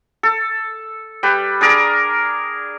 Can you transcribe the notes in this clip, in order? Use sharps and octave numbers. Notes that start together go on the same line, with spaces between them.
A4
G3 B4
D4 G#4 A#4